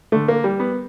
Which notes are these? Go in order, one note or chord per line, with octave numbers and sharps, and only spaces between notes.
D3 A3
A#3
G3
B3